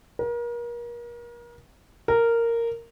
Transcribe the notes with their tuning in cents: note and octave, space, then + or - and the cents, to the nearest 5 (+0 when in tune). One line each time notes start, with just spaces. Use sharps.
A#4 +35
A#4 -10